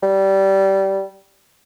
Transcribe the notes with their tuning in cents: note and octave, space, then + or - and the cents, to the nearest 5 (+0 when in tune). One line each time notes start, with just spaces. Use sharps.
G3 -20